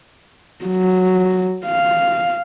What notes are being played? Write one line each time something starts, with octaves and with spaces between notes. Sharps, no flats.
F#3
F5